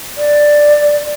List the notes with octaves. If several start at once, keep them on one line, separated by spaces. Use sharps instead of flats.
D5